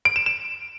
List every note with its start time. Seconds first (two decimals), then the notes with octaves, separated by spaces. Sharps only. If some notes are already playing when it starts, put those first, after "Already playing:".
0.05 D7
0.16 E7
0.26 E7